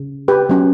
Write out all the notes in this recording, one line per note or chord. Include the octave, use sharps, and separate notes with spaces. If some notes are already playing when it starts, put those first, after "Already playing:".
Already playing: C#3
G4 B4
F#3 C#4